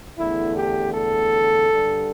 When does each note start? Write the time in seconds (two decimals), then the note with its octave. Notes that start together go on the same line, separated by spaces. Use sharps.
0.17 E2 D3 A3 E4
0.56 G4
0.94 A4
1.71 G2 D3 G3